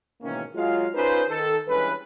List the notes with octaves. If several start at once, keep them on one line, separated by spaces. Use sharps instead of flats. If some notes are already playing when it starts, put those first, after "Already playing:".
G#2 B2 D#3 E3 A#3 C#4
F#3 G#3 F4 F5
C#4 D#4 F4 G#4 B4 C5
D#3 A4
G2 E3 G#3 C#4 B4